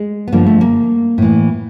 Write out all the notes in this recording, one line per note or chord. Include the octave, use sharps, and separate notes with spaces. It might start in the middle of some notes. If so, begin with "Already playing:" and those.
Already playing: G#3
B3
G2 D3 F3 A#3
A3
A#3
A2 E3